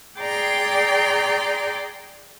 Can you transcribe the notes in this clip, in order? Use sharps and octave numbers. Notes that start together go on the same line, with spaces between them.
G#4 D5 G5 A#5 C6